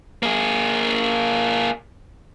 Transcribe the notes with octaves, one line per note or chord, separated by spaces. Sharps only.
A#3 G#4